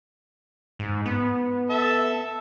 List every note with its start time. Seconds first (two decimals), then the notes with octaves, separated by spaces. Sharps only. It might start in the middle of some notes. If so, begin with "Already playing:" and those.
0.79 G#2
1.05 B3
1.70 A4 E5 A5